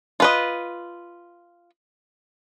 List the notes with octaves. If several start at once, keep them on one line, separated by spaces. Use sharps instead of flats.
F4 B4 D#5